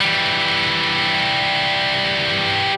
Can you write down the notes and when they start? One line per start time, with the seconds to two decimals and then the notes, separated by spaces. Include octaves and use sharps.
0.01 E3 G3